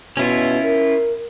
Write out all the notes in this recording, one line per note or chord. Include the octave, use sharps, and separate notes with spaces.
B2 C#4 E4 F4
A#4